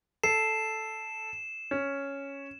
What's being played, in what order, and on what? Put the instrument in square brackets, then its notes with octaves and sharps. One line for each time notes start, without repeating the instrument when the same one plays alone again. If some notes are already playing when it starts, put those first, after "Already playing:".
[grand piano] A4 [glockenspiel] C7 [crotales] E7
[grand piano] C#4